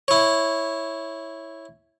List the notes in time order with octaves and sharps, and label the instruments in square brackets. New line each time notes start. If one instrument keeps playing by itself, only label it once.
[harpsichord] E4 C#5